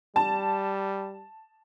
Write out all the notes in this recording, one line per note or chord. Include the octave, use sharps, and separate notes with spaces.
G3 A5